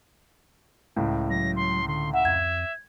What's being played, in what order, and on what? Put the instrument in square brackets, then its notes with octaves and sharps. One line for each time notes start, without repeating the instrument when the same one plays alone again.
[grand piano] C#2 A2
[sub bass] F#3 [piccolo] A#6
[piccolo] C6
[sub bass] D3 [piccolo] C6
[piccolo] E5 [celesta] F#5
[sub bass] F2 [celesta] G#6